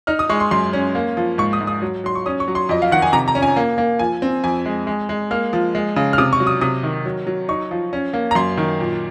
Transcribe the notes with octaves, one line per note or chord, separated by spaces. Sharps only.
D#4 F6
D#6
G#3 C#6
C6
F#2 C6
C#4
A#3
F3
G#2 C#6
D#6
G#2
D#6
F#3
F#3 C6
C#6
C#4 D#6
C#6
F#3
C6
F2 D#5
F5
D#3 F#5
G#5
C3 A#5
A#5
C#4
G#5
A#3
A#3
F3 G#5
C4
F2 G#5
G#3
G#3
G#3
A#3 F6
F3
G#3
C#3
F6
C3 D#6
C#6
F#3
D#6
C3 D#6
D#3
F#3
F#3
D#4 C#6
F3
C#4
A#3
A#5
F#2 C6
D#3
A#2